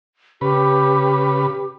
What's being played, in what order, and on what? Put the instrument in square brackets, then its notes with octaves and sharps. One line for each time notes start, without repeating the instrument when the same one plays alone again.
[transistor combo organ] C#3 B4 [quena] G4